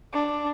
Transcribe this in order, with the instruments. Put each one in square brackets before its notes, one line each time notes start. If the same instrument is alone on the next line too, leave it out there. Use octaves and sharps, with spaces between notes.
[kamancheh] D4